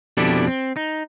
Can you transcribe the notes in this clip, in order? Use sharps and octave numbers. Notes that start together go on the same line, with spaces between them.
F2 B2 D4 E4 G4 A4
C4
D#4